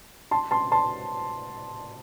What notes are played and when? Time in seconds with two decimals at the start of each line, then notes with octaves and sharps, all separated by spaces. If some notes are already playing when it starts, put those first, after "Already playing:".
0.31 A5 C6
0.51 A5 C6
0.72 A5 C6